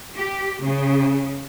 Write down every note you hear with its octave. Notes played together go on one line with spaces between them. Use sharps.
G4
C#3